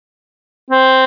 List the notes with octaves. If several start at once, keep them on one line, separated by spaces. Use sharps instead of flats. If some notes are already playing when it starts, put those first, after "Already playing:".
C4